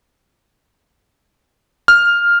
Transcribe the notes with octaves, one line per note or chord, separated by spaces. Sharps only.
F6